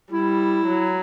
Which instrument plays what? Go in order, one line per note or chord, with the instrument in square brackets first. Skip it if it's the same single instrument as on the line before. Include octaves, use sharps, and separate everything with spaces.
[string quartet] G3 [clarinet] E4
[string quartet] F#3